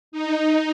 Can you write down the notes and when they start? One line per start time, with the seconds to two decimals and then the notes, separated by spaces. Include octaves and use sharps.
0.12 D#4